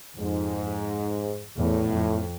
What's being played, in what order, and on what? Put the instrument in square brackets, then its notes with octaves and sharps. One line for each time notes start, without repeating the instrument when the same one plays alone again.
[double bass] F2 [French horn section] G#2
[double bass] E2 [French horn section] A2
[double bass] F2